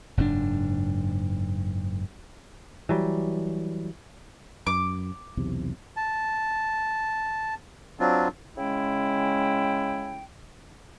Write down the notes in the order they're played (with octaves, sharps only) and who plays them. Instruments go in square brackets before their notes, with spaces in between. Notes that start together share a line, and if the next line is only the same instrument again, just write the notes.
[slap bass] F#1 G#2 C4 D4
[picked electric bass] E3 F#3 G3
[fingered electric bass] F#2 [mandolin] D6
[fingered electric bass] B1 E2 C3
[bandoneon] A5
F#3 C4 D4 F4
[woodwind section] C#3 G#3 C#4 E4 G5